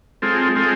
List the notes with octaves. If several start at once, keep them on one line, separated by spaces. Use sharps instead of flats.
G#3 C4 F4 A4
G#3 C4 F4 A4